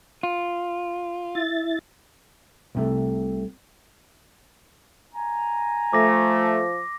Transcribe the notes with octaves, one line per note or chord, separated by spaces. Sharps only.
F4
E4 A6
C2 C3 A3
G#5 A#5
F3 A3 D6 A#6